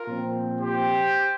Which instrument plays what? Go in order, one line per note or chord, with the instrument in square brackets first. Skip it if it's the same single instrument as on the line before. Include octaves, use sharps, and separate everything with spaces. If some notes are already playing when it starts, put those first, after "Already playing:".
Already playing: [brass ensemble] F4 A#4
A#2 F3 C4
G4 C5